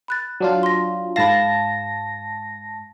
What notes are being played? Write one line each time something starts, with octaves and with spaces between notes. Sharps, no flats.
B5 F#6 A6
F#3 D4 F4
C6 A#6
G#2 F5 A5 B5 A#6